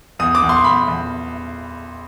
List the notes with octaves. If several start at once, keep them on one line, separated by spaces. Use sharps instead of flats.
E2 D#6
D6
E2
C6
E2 B5
E2